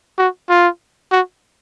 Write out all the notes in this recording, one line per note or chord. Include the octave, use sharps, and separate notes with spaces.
F#4
F4
F#4